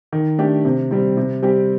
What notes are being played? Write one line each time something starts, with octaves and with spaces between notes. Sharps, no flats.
D#3
A3 D4 G4
C3
G3 C4
C3
G3 C4 G4